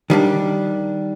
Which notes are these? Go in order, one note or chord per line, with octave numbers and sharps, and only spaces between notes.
D#3 G3 D4